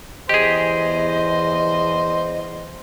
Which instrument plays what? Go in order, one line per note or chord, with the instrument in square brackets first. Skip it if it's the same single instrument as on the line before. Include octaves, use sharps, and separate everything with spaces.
[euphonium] E2 [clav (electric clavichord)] G4 G#4 [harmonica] C5 [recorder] D#5